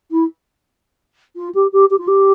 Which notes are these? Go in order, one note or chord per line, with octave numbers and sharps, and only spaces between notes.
E4
F4
G4
G4
G4
F4
G4